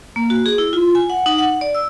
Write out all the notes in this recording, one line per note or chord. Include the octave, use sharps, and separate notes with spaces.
A#3
F#4
G#4
E4
F4
G#5
F#5
D#4
F#5
D5
E6